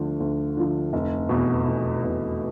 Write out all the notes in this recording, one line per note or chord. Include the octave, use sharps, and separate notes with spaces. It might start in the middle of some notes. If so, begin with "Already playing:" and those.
Already playing: D2 D3 F3
D2
D3 F3
F1
E2 B2
F1
E2 B2